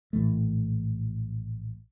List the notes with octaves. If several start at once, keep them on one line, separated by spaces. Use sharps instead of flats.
A#1 A2 E3 A3